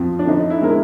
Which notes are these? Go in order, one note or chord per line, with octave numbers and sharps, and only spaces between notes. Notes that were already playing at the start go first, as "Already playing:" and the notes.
Already playing: F2 F3
D4
D3 D#4
E4
G#3 A#4